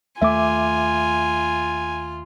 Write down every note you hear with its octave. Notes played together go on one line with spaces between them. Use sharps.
D#2 A3 F4 E5 G#5 D6